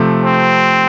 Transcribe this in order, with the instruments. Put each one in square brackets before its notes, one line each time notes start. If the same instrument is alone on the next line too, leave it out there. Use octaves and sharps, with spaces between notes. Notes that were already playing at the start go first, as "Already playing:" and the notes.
Already playing: [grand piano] C3 F3 A3
[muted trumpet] C4